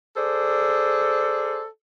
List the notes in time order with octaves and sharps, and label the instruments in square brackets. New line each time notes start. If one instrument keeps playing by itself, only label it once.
[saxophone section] G#4 A4 C5 D5